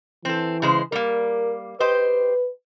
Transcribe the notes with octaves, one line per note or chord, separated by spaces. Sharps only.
E3 C4 A4
C#3 G#3 C5
G3 A#3 A#4
G4 B4 C5 D#5